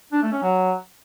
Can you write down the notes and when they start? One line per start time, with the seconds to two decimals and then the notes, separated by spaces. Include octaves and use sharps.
0.12 D4
0.22 A3
0.32 C#4
0.42 F#3